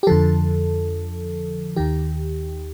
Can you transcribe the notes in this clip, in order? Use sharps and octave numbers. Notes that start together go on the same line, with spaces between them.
G4
F2 D3 F3 A4
D#2 D#3 G4